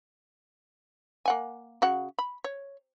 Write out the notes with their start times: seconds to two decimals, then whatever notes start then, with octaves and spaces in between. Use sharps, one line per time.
1.25 A#3 F#5 G#5
1.82 C#3 F#4 F#5
2.19 B5
2.44 C#5